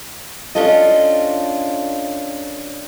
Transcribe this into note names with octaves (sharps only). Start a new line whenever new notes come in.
C#4 D4 F4 A4 D#5